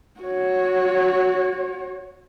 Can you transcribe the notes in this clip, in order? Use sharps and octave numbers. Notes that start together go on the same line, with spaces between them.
F#4 C#5